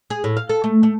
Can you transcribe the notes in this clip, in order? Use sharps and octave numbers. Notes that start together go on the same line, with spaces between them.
G#4
A2
F5
A4
A3
A3